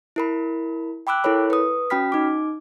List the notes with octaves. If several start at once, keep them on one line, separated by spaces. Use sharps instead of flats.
E4 A#4 B5
G5 B5 D6 E6 F#6
E4 A4 A#4 C#5 B5
B4 D#6
C#4 F#4 G5 B5 F6 B6
D#4 D6